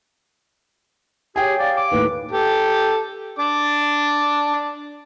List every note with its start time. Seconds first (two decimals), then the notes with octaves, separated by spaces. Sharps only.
1.36 G4 G#4 C#5 G5 G#5
1.59 D5 F5
1.77 D6
1.91 D#2 A2 B4
2.31 G4 A4
3.39 D4 D6